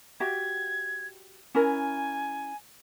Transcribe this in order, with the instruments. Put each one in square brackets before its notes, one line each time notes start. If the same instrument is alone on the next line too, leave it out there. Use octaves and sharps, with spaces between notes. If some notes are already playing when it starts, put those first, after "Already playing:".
[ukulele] F#4 G4 E5 [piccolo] G#6
[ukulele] C#4 E4 A#4 [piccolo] G#5